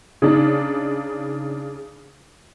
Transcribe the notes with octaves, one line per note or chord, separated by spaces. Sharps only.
C#3 D4 D#4